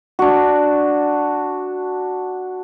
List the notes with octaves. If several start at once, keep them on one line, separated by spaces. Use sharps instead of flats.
D4 F#4